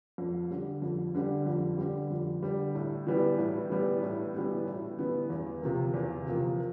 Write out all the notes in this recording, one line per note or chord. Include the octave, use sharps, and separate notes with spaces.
F2
D3 G3
F2
D3 G3
F2
D3 G3
F2
D3 G3
A2
E3 G3 B3
A2
E3 G3 B3
A2
E3 G3 B3
A2
E3 G3 B3
E2
C3 F3 A#3
E2
C3 F3 A#3